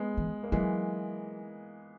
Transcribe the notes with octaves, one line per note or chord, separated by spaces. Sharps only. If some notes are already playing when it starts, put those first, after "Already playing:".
Already playing: G#3 B3
E3
A#3
E3 F#3 G#3